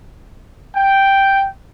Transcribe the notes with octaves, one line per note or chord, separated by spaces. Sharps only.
G5